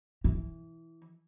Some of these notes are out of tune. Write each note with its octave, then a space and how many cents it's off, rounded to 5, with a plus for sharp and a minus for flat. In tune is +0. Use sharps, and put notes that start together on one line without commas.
E3 -5